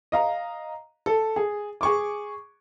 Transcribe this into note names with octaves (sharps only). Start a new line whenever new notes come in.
D#5 F5 A#5
A4
G#4
G#4 C#6 D6